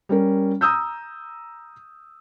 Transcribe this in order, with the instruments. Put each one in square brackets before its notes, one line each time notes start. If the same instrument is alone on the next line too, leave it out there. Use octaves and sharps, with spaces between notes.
[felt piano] G3 C#4 A#4
A#5 D#6 E6 G6